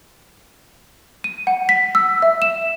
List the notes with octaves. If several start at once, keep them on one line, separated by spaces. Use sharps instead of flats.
D#7
F#5
B6
E6
E5
E7